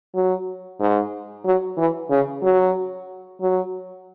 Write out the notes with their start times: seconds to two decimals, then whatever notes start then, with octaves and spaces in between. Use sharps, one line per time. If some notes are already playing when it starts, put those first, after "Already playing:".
0.15 F#3
0.79 G#2
1.45 F#3
1.77 E3
2.10 C#3
2.42 F#3
3.41 F#3